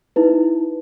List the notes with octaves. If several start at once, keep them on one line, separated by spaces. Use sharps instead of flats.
D#4 E4 B4